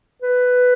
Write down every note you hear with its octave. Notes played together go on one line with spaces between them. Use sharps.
B4